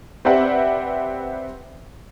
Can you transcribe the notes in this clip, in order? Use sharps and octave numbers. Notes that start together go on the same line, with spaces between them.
C4 G4 B4 D5 E5 F#5